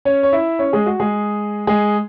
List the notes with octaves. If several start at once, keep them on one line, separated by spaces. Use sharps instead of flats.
C#4 C#5
C#5
E4 E5
C#4 C#5
G#3 G#4
F#4
G#3 G#4
G#3 G#4